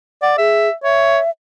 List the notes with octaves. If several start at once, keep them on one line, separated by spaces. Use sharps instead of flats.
D5 F#5
G#4 E5
C#5 E5